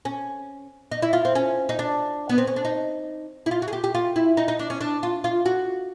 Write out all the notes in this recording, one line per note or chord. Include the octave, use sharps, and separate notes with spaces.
C#4
D#4
E4
F4
C4
C#4
D#4
D4
B3
C4
C#4
D4
D#4
E4
F4
F#4
G#4
G4
G4
F4
E4
D#4
D#4
D4
C#4
D4
F4
F4
F#4